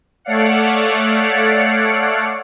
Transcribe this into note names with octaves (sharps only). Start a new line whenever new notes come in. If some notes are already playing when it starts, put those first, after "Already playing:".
A3 A4 C#5 D5 F5 F#5